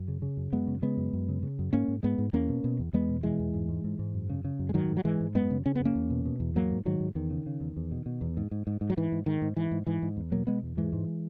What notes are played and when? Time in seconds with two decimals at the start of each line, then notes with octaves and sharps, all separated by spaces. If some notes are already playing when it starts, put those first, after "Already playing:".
Already playing: F#2
0.08 C#3
0.22 C#3
0.37 F#2
0.52 F#2 G#3 B3
0.67 C#3
0.82 C#3 G#3 B3
0.97 F#2
1.13 F#2
1.29 C#3
1.43 C#3
1.59 F#2
1.73 G#2 A#3 C#4
1.88 G#2
2.03 G#2 G#3 B3
2.18 G#2
2.33 E2 A#3 C#4
2.48 B2
2.64 B2
2.79 E2
2.93 E2 G#3 B3
3.09 B2
3.23 B2 E3 G#3
3.39 E2
3.54 G#2
3.69 G#2
3.84 G#2
3.99 G#2
4.14 F#2
4.30 C#3
4.45 C#3
4.59 F#2
4.69 G#3
4.74 G#2 D#3 F#3
4.89 G#2
4.97 F#3
5.04 G#2 E3 G#3
5.21 G#2
5.35 F#2 G#3 B3
5.51 C#3
5.66 C#3 C#4
5.75 B3
5.80 F#2
5.85 A#3 C#4
5.95 E2
6.10 B2
6.25 B2
6.40 E2
6.55 G#2 F#3 A#3
6.71 G#2
6.85 G#2 D#3 F#3
7.00 G#2
7.15 E2 D#3
7.30 C#3
7.46 C#3
7.61 E2
7.77 E2
7.92 B2
8.06 B2
8.21 E2
8.37 G#2
8.51 G#2
8.67 G#2
8.81 G#2
8.90 F#3
8.97 G#2 E3
9.12 G#2
9.26 G#2 D#3
9.42 G#2
9.57 G#2 E3
9.71 G#2
9.87 G#2 E3
10.02 G#2
10.17 E2
10.32 B2 F#3 A#3
10.47 B2 G#3 B3
10.63 E2
10.77 G#2 E3 G#3
10.93 G#2